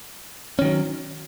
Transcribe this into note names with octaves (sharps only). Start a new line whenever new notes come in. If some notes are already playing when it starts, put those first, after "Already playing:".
D#3 F#3 C#4